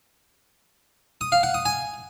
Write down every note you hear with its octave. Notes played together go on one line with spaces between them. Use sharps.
D#6
F5
F#5
D#6
G#5